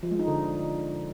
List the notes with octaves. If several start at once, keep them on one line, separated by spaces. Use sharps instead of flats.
F3
G#3
D#4
D3